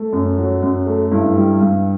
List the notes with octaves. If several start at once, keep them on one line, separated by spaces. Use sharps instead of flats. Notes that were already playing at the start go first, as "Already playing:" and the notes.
Already playing: A3
F#2
F#3
F#2
A3
G2 E4
G3
G2